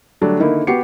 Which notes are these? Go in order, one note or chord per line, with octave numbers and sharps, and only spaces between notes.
D3 F#3 G3 A3 D4
D3 D#3 A#3 D#4 E4
B3 F#4 G4 F#5 C7 C#7